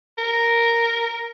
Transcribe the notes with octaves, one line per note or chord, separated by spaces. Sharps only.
A#4